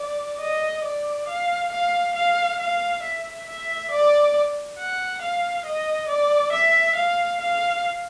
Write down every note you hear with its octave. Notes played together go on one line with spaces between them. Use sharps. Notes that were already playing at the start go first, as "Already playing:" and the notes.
Already playing: D5
D#5
D5
F5
F5
F5
F5
E5
E5
D5
F#5
F5
D#5
D5
E5
F5
F5